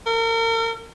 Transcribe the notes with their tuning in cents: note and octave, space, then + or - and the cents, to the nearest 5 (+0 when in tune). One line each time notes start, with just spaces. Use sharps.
A#4 -40